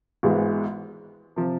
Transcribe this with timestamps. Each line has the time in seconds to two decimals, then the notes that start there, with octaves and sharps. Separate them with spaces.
0.23 G#1 G#2 E3 G#3 B3
1.36 C3 F3